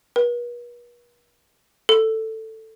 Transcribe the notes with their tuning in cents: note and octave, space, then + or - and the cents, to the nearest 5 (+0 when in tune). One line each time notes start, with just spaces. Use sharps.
B4 -45
A4 +10